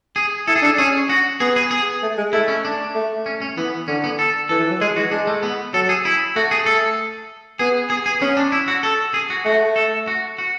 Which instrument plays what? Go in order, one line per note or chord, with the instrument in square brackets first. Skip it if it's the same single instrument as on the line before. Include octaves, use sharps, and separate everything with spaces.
[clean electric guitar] G#4
[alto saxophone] E4 [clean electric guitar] A4
[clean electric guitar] G#4
[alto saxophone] D4 [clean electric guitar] A4
[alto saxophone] C#4 [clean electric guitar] G#4
[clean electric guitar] F#4
[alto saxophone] B3 [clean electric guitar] G#4
[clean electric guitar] G#4
G#4
[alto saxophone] A3
G#3
[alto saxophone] A3 [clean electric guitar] E4
[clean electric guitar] C#4
D4
[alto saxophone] A3
[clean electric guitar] C#4
C#4
[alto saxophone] E3 [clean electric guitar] B3
[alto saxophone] D3 [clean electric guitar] C#4
[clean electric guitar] B3
A4
[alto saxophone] E3 [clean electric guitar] A4
[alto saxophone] E3
F#3
[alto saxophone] G#3 [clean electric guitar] G#4
[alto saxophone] E3 [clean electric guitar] F#4
[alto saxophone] G#3 [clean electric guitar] D4
[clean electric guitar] A3
B3
[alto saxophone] F#3 [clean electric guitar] A4
[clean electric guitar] G#4
E4
[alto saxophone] A3 [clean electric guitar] F#4
[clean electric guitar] G#4
A4
[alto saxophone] B3 [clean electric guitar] G#4
[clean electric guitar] G#4
G#4
[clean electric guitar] B3 [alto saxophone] C#4
[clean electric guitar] D4
E4
F#4
A4
G#4
F#4
[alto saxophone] A3 [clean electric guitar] F#4
[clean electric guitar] A4
F#4
F#4